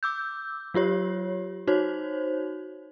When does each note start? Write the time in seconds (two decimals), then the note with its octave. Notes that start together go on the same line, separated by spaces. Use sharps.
0.03 D6 E6 G6
0.74 F#3 F4 G4 C#5
1.67 D#4 F#4 C5 C#5